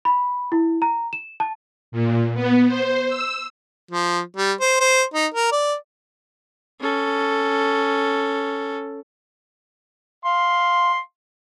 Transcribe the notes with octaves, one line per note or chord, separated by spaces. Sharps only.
B5
E4
A#5
E7
A5
A#2
B3
C5
E6
F3
G3
C5
C5
D#4
A#4
D5
C#4 A4
F5 C6